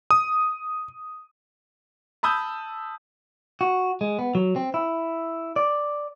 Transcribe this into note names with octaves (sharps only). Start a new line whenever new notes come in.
D#6
A5 B5 D#6 E6 G6
F#4
G#3
B3
F#3
C4
E4
D5